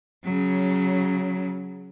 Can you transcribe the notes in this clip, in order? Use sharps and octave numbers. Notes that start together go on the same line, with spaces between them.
C#3 F#3